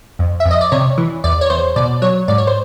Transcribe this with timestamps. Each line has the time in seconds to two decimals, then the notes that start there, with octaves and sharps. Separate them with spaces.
0.19 F2
0.40 E5
0.45 F2
0.51 D#5
0.61 D5
0.72 C3 C#5
0.98 E3
1.24 E2 D5
1.41 C#5
1.50 E2 C5
1.76 B2 D5
2.02 F#3 C#5
2.28 G#2 D5
2.38 C#5
2.47 C5